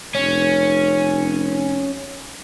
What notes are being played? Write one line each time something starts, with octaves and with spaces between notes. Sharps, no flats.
F1 C#4